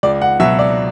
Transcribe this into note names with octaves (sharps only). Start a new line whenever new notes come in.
C#2 D5
F#5
B2 F#3 E5
D5